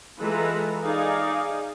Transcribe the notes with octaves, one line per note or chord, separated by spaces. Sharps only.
E3 G#3 F4 A4 B4 A#5
D#4 G#4 D5 F5